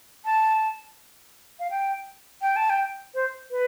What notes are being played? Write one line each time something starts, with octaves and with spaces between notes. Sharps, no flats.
A5
F5
G5
G5
A5
G5
C5
B4